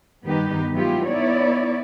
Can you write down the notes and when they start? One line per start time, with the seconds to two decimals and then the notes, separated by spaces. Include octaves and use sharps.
0.24 G2 D#3 B3 D#4 G4 B4
0.73 F#3 G#3 B3 E4 F4 G4
1.07 B3 D#4 E4 C#5 D5